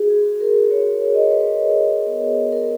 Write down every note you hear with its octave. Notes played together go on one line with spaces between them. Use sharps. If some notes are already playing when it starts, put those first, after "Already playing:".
Already playing: F#4 G#4
G#4
F#4
A#4
F#4 C#5
C#5
F#4 D#5
C#5
B4
F#4
B3
B3 A#4